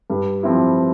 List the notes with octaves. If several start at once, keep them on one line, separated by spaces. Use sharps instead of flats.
G2
F3 C4 E4